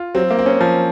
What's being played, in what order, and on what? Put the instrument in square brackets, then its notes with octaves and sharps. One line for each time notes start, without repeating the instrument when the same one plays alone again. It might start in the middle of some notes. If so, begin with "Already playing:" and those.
Already playing: [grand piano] F4
[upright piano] F#3 [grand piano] C4
[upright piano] A#3
[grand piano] C4
[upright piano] C#4
[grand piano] F3